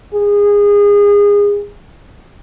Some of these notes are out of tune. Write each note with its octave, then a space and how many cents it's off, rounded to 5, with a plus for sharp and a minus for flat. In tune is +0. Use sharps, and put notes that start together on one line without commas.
G#4 -25